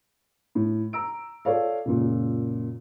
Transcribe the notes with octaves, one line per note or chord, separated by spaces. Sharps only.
A2
A#5 E6 D7
F4 A4 C#5 D5 F5
C#2 F#2 A#2